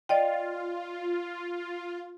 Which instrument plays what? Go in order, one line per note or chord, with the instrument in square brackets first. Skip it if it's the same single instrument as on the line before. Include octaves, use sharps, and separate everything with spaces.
[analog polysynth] F4 [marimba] D5 D#5 G5